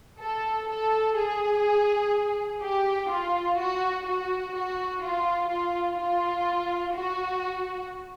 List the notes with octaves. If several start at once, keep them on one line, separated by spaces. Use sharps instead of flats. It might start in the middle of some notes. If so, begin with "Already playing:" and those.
A4
A4
G#4
G4
F4
F#4
F#4
F#4
F4
F4
F4
F#4